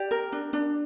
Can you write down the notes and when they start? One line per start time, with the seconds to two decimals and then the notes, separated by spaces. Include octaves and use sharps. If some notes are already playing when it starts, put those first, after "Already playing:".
Already playing: G4 D5
0.11 A#4
0.32 D4
0.53 D4